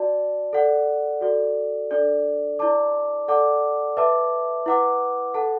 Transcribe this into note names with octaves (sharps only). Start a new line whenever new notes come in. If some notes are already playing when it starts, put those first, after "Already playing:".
Already playing: F#4 D5 A5
A4 D5 F#5
F#4 A4 D5
D4 A4 D5
E4 D5 A5 D6
A4 D5 F#5 A5 D6
B4 E5 A5 D6
E4 B4 F#5 D6
A4 F#5 A5